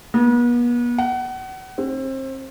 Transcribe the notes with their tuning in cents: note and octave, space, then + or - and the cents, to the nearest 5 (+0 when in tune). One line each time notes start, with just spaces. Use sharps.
B3 -40
F#5 +30
C4 +30